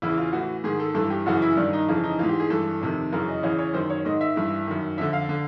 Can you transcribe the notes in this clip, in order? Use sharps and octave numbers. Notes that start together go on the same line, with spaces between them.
E2 C#3 E3 E4
F4
A2 E3 F#4
G#2 D#3 G#4
A4
G2 E3 A4
G4
F#2 C#3 E3 F#4
E4
G2 D#3 D4
D#4
F2 C#3 E3
D#4
G#2 E3 F4
G4
G#4
G2 E3 A4
F2 C3 D#3
F#2 C#3 E3 A#4
D#5
E2 C#3 E3 C#5
C#5
F#2 D#3 C5
C#5
G#2 D#3 D#5
E5
G2 E3
F#2 D#3
F2 D3 E5
F5
D3